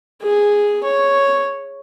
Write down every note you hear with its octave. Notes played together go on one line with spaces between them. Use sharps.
G#4
C#5